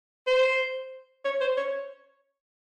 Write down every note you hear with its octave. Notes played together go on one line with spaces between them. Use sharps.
C5
C#5
C5
C#5